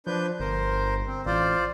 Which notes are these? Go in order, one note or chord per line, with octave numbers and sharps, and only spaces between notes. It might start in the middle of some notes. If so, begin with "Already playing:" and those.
F3 D4 B4 G6
G1 A#4 C5
C4
A1 F4 C5 D5